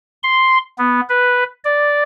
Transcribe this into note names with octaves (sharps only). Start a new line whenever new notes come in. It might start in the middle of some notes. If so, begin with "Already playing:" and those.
C6
B3
B4
D5